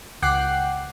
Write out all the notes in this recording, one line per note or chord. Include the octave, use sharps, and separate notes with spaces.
C#2 F#5 G5 D6 F#6 C7